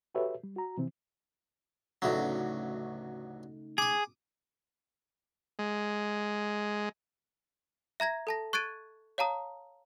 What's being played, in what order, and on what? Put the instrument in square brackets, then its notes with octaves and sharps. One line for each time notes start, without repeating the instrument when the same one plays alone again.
[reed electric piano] F#4 G4 A4 B4 C#5 E5
G3
F#4 A#5
C3 E3 F3 C4
[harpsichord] A1 D2 F#3 [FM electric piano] C#3 A3 D#4
[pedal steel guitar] G#4 [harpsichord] D6 D#6
[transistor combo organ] G#3
[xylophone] E5 A#5 G#6 A#6
A4 A5 A#6
C#6 F#6 G#6 A6 D7 D#7
C#5 F5 A5 A#5 D#6